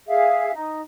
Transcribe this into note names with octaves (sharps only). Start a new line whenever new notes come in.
G#4 E5 F5
D#4